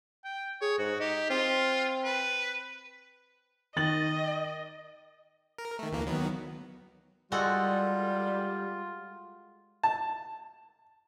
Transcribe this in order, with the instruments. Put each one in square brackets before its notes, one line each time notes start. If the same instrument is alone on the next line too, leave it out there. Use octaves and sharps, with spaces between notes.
[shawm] G5
[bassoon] G#4 [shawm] C#5
[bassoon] G#2 [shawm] F#4
[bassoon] D#4 [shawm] G4
[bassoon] C4 [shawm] F4
[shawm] B4
[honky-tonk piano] D#3 A6 F#7 [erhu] D#5
[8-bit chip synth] A#4
D#3 A3
D2 E3 A#3
D#3 F#3 B3
[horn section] G3 [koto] G#3 F#4 A4 [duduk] F4
[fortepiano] A5